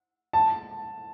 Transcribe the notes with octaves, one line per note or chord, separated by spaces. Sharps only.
A5